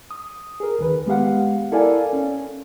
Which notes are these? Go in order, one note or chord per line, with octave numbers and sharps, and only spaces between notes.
D#6
G#4 A#4
D2 D#3 B4
G#3 B3 G4 F5 F#5
E4 A4 A#4 D5 F5 G#5
C#4